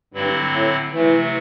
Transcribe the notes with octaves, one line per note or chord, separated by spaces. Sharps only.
G2 D3 F#3 C4 E4
A2
C3 E3 F#3 A3